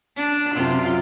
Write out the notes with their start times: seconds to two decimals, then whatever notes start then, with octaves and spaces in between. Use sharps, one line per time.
0.16 D4
0.54 F#2 C3 F4